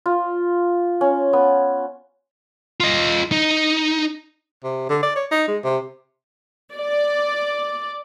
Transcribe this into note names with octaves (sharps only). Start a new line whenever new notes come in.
F4
C#4
B3
F4 D#5
D#4
C3
D3
D5
C#5
D#4
G#3
C3
D5